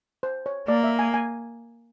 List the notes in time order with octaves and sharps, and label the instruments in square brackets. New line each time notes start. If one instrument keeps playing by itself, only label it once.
[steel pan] C5
C#5
[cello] A#3 [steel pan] D5
[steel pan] E5
G#5
G#5